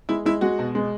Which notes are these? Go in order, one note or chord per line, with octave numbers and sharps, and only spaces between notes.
G#3 E4
G#3 E4
G#3 F#4
B2
G#3